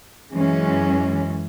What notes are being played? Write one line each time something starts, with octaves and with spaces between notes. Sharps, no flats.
F#2 E3 G#3 C#4